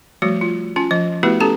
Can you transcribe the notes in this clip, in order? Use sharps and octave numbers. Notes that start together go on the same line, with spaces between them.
F3 G3 A3 F#4
F4
C#4 F4 G#5
F3 D#5
A3 B3 E4 F#4 G4 B4
C#4 G4 A4 A#5